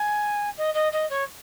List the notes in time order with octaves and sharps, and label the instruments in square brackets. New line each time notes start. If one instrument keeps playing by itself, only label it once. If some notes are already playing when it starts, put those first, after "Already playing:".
Already playing: [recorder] G#5
D#5
D#5
D#5
C#5